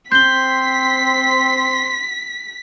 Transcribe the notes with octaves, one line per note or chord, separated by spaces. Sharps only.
C4 C6 G6 B6 G7